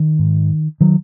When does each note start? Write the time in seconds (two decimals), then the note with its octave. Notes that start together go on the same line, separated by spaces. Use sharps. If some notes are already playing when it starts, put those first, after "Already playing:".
Already playing: D#3
0.19 G#2
0.80 D#3 F#3